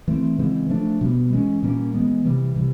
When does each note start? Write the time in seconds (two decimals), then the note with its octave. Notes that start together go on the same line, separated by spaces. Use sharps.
0.08 E3 A3 C4
0.38 C#3 E3 G#3 C4
0.70 F3 A3 D4
1.01 B2 G3 B3
1.32 E3 G#3 C#4
1.63 A#2 G3 A#3 C#4
1.94 E3 G#3 B3
2.25 C3 E3 G3
2.56 C3 E3